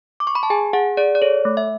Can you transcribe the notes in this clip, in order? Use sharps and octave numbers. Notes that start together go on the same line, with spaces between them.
D6
C#6
B5
A5
G#4 G#5
G#4 F#5
G#4 D5
D5
A4 C#5
A3
E5